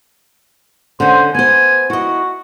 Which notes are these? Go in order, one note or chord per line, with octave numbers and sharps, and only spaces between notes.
D3 C#4 C5
B3 C5 G#5
E4 F#4 D#5